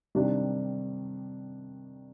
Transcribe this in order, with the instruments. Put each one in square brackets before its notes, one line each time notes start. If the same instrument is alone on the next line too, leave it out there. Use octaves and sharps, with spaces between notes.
[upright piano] C3 D#3 G3 D4